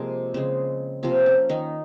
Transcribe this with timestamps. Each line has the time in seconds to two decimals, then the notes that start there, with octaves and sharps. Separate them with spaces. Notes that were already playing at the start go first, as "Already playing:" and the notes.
Already playing: C3 F3 G#3 A#3 G#4 A#4
0.34 C#3 G#3 C4
1.03 C3 F3 A#3 C4
1.26 C#4
1.49 D#3 D#4